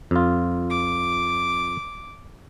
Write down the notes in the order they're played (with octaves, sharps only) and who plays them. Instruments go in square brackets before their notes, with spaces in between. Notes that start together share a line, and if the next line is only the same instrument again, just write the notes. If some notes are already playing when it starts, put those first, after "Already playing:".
[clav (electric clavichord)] F2 F4
[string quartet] D6